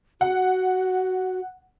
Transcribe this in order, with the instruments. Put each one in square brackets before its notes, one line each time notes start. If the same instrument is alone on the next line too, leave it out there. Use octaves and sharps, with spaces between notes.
[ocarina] F#4 [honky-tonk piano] F#5